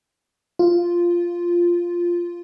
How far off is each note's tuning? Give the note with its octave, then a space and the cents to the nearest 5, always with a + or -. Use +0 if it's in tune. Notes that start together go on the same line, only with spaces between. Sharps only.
F4 -5